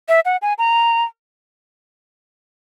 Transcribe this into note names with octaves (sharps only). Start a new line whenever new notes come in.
E5
F#5
G#5
A#5